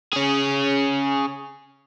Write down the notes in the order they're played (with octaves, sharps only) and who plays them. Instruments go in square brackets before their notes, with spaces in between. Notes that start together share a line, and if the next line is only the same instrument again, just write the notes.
[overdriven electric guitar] C#4 G#4